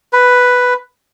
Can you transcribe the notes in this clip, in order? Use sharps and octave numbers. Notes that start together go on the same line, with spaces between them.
B4